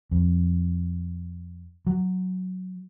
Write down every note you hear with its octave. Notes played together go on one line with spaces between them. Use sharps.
F2
F#3